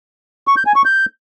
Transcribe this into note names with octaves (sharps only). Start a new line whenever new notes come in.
C#6
G6
G#5
C#6
G6